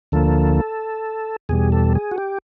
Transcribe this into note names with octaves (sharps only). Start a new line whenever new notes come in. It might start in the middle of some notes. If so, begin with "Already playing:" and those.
D2 D3 F3 A#3 A4
E2 B2 G3 G#4
A4
G#4
F#4
G4